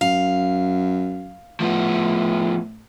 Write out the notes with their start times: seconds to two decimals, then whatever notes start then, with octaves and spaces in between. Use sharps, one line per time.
0.01 F#2 F5
1.60 A2 F3 B3